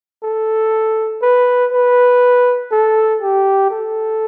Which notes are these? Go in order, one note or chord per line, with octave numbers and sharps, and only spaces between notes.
A4
B4
B4
A4
G4
A4